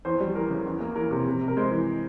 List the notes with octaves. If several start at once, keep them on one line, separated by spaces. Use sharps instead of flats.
E2 C5
G3
E3 A#4
C#3
E2
A#3
E3 A#4
C3
C3
C3
A#4
G#3 C5
E3